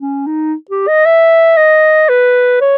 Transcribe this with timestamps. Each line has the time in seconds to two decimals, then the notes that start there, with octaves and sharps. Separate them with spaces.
0.02 C#4
0.27 D#4
0.71 G4
0.88 D#5
1.05 E5
1.57 D#5
2.09 B4
2.61 C#5